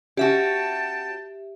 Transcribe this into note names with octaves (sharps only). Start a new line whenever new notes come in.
C#4 F#4 G4 E5 G5 A5